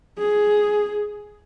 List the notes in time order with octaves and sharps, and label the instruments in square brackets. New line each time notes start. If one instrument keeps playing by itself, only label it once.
[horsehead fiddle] G#4